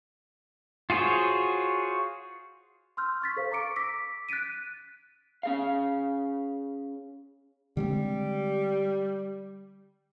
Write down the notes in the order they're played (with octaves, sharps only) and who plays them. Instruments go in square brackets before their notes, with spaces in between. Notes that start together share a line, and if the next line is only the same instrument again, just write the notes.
[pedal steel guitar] F4 F#4 G#4 C5 C#5
[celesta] C6 E6 F6 G6
C6 C#6 A6 B6
A4 C5 F5
A#5 C#6 D6 C#7 D7
D6 E6 A#6 B6 D7
F#6 A6 B6 D7 D#7
[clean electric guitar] C#4 G#4 F5
[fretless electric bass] D3 G#3 C4 [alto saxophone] G3